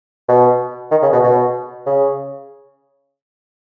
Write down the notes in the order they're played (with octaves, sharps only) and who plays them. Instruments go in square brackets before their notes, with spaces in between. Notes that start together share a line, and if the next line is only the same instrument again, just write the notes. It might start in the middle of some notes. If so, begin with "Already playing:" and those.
[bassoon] B2
D#3
C#3
B2
B2
C#3